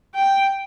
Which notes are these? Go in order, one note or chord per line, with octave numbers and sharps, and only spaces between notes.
G5